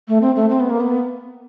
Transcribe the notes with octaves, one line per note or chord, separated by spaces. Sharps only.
A3
C4
A3
C4
B3
A#3
B3